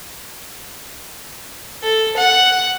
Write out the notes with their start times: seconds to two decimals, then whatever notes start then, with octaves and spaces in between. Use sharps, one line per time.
1.83 A4
2.17 F#5